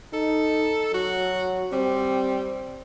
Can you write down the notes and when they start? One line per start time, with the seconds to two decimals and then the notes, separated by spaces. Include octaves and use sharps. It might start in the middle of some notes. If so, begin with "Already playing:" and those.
0.13 D#4 A4
0.94 F#3 F#4
1.72 G3 C4